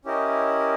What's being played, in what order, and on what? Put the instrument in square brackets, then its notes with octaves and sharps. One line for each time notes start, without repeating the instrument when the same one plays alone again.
[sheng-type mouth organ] C#4 E4 G4 A#4 D#5